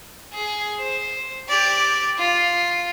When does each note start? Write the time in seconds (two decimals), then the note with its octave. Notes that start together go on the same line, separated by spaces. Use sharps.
0.33 G#4
0.80 C5
1.49 G4 D5
2.19 F4